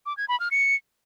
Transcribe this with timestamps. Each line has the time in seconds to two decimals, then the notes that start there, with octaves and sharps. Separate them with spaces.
0.06 D6
0.17 G#6
0.29 B5
0.40 F6
0.51 C#7